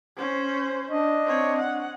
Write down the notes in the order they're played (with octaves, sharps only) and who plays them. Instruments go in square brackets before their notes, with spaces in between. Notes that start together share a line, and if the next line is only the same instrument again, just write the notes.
[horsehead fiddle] C#4 C5
[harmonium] D4 D#5
[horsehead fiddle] C4 C#5
F#5